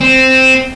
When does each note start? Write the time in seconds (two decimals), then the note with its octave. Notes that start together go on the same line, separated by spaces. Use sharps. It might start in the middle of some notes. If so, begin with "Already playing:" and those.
0.01 C4